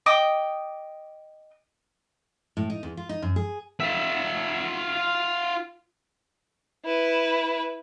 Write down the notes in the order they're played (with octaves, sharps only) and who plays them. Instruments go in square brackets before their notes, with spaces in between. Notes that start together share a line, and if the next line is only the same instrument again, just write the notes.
[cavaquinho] D#5 G5 D6 D#6
[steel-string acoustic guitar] A2
D#4
E2
F4
D#4
F#2
G#4
[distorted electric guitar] F4 E5
[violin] E4 B4